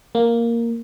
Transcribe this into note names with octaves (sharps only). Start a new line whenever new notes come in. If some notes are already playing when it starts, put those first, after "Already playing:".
A#3